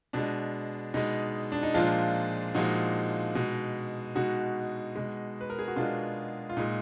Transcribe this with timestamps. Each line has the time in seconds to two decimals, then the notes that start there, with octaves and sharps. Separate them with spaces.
0.13 B2 G#3 D4
0.94 B2 G#3 D#4
1.52 D4
1.63 D#4
1.74 A#2 F3 G#3 D4 F4
2.55 A#2 F3 G#3 D#4 F#4
3.35 B2 G#3
4.15 B2 G#3 D#4 F#4
4.95 B2 G#3
5.41 B4
5.50 A#4
5.59 G#4
5.68 F#4
5.76 B2 G#3 D4 F4
6.49 F4
6.57 A#2 G#3 D#4